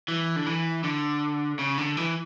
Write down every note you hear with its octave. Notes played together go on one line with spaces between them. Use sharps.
E3
D3
E3
D3
C#3
D3
E3